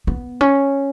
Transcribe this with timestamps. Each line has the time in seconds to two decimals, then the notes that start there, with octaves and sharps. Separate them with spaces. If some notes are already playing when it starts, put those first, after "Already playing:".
0.07 B3
0.41 C#4